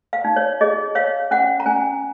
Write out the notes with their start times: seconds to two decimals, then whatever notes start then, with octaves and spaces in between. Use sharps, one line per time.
0.13 F5
0.25 D#4
0.36 C#5
0.61 G#4 D#5
0.95 C#5 F5
1.31 C#4 F#5
1.60 A#5
1.66 C#4 G#5